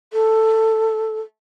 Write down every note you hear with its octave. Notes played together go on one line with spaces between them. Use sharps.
A4